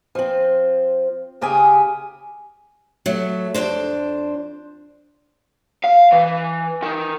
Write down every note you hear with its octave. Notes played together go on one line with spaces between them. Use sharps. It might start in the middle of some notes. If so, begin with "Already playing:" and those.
F3 C4
D#2 C#3 G4 G#4 G#5
F#3 A3
F2 C3 D4 C5
F5
E3
D#3